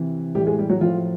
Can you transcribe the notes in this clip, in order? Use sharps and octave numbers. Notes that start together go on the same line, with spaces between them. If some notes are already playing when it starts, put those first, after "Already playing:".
Already playing: C3 E3
A2 E3 G3 G4
G#3 G#4
G3 G4
F#3 F#4
A2 F3 F4